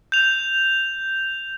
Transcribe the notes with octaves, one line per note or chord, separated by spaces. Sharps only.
G6 F7